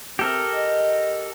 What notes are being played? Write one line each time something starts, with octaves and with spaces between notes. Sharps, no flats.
C3 G4 A4 A#4
D#5